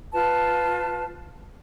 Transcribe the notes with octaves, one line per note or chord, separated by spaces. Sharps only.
F4 B4 A5